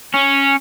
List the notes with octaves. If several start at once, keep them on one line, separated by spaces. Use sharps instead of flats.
C#4